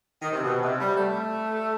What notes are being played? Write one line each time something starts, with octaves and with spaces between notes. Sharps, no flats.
D#3
C3
B2
C3
G3
A3